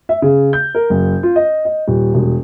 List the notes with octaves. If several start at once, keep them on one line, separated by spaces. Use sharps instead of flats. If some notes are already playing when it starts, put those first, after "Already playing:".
E5
C#3
G6
A#4
F#1
F4
D#5
D#5
D#1
E1